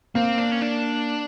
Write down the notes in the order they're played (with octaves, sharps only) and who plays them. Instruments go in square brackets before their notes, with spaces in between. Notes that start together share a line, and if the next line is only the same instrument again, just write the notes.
[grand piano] A#3 [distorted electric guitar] C4
[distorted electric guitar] D4
C#4
D4